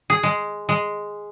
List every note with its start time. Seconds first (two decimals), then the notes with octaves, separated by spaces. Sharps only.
0.10 G#4
0.23 G#3
0.69 G#3